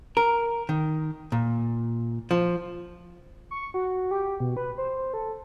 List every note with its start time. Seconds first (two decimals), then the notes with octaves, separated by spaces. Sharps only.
0.17 A#4
0.69 D#3
1.32 A#2
2.31 F3
3.51 C#6
3.74 F#4
4.11 G4
4.40 B2
4.57 B4
4.78 C5
5.14 A4